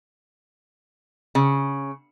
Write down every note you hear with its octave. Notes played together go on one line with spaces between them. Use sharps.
C#3